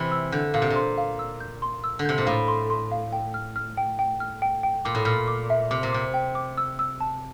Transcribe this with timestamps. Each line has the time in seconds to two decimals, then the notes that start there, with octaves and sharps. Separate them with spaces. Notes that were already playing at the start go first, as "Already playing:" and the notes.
Already playing: C3 E3
0.11 E6
0.32 D3 G6
0.54 A#2 F5
0.62 C3
0.70 A#2
0.76 C6
0.98 F5
1.19 E6
1.40 G6
1.62 C6
1.84 E6
1.99 D3
2.05 C3 G6
2.18 A#2
2.27 A2 F5
2.48 C6
2.70 C6
2.92 F5
3.12 G5
3.34 F6
3.56 F6
3.77 G5
3.99 G5
4.20 F6
4.42 G5
4.63 G5
4.85 A#2 D6
4.95 A2
5.05 A#2 F6
5.28 D6
5.50 E5
5.71 C3 D6
5.83 A#2
5.93 C3 D6
6.14 G5
6.35 D6
6.58 E6
6.79 E6
7.00 A5